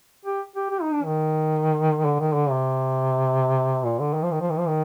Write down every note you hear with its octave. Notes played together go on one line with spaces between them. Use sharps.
G4
G4
G4
D#4
D4
D#3
D3
D#3
D3
C3
A#2
D3
D#3
F3
D#3
F3
D#3
F3
D#3